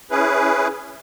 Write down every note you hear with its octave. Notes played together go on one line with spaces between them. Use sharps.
C#4 E4 G#4 B4